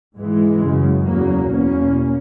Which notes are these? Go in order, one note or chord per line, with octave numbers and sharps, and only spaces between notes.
G#2 E3 G#3
F#2 C#3
E2 C#3 F#3 A#3
E2 B2 A#3 C#4